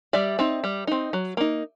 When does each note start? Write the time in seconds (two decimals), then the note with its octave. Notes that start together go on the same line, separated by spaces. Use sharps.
0.13 G3 D5 E5
0.39 C4 D#4
0.64 G3
0.87 C4 D#4
1.13 F#3
1.37 A#3 D#4